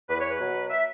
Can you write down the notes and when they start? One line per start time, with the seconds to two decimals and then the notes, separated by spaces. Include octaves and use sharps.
0.08 E2 B4
0.18 C#5
0.29 B4
0.39 B2 F#3
0.70 E5